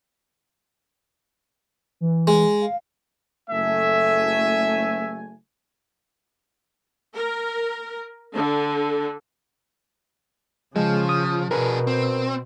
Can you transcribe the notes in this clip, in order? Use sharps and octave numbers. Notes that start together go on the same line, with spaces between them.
E3
G#3
F5
F#1 A3 E5 G#5
A#4
D3
C#3 F3 G#3
D#6
B2 D4 G#4 A#4 B4
C4